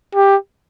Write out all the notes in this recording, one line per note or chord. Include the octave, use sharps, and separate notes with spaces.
G4